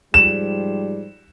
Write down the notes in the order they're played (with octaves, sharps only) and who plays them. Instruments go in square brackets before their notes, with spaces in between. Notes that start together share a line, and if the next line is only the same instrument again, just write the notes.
[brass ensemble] G#2 F3 G3 [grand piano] E7